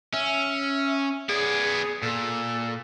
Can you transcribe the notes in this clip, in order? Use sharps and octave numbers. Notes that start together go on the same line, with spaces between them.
C#4 E5
B3 G#4 D5
A#2 A4